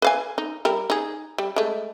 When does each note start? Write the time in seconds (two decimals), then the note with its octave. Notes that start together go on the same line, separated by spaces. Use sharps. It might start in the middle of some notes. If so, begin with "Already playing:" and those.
0.02 B4 F5 G#5
0.38 D#4
0.65 G3 A#4
0.90 D#4 G#4
1.38 G3
1.56 G#3 A3